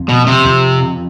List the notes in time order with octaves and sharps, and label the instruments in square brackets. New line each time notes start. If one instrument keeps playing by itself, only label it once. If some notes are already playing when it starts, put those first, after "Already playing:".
Already playing: [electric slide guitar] F2
[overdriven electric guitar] B2
C3
[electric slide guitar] F2